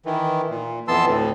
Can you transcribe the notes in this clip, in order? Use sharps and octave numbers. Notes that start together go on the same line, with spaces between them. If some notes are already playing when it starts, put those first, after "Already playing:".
D#3 E3
A#2
F2 E3 B3 A5 C6 E6
D2 A2